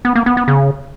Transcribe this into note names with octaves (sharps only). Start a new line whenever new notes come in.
B3
A#3
B3
B3
C#3